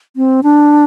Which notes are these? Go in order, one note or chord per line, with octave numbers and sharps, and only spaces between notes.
C4
D4